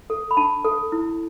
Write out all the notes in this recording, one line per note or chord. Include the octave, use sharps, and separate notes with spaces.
A4
B5
D4 A5
A4
E4